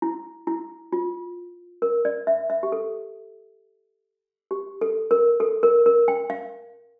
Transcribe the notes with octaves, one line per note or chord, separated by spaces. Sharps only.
E4
E4
F4
A#4
D5
E5
E5
G4
A4
G4
A4
A#4
A4
A#4
A#4
G5
F5